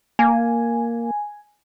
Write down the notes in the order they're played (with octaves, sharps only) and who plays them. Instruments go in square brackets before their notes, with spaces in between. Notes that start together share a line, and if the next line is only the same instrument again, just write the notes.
[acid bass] A#3 [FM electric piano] G#5